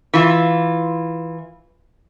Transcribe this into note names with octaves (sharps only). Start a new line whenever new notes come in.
E3 F4